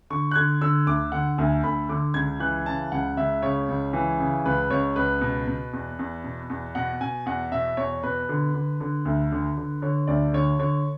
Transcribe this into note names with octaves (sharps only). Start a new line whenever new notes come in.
D3 C#6
F#6
D3 G#6
D3 E6
D2 D6
D3 F#5
D2 G#5
D2 B5
D3 D6
C#2 G#6
E3 F#6
C#3 A5
C#2 F#5
C#2 E5
C#3 C#5
C#2
E3
C#3
C#2 B4
C#2 C#5
C#2 B4
B2
B2
E2
E2
B2
E2
B2 F#5
B2 G#5
E2 F#5
B2 E5
E2 C#5
B2 B4
D3
D3
D3
D2
D3
D3
D3 C#5
D2 D5
D3 C#5
D3 C#5